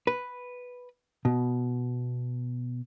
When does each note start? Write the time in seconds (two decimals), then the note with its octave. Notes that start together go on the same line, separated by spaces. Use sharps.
0.07 B4
1.25 B2